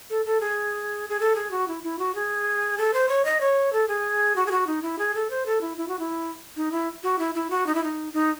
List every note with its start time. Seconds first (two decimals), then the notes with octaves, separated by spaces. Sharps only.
0.10 A4
0.26 A4
0.41 G#4
1.09 G#4
1.20 A4
1.36 G#4
1.51 F#4
1.68 E4
1.83 E4
1.99 F#4
2.15 G#4
2.78 A4
2.94 C5
3.09 C#5
3.25 D#5
3.41 C#5
3.73 A4
3.88 G#4
4.36 F#4
4.47 G#4
4.51 F#4
4.67 D#4
4.83 E4
4.99 G#4
5.15 A4
5.30 C5
5.46 A4
5.61 E4
5.77 E4
5.88 F#4
5.99 E4
6.56 D#4
6.72 E4
7.03 F#4
7.19 E4
7.35 E4
7.50 F#4
7.67 D#4
7.75 E4
7.84 D#4
8.13 D#4